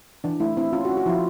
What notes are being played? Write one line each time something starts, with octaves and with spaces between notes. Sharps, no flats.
E3 D4
A3 E4
C4 E4
C#4 F4
F#4
C#4
F#4
F3 E4 F4